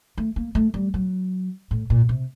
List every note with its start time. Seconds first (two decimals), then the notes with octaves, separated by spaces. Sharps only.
0.18 A3
0.36 A#3
0.55 A3
0.74 G3
0.94 F#3
1.71 A2
1.90 A#2
2.09 C3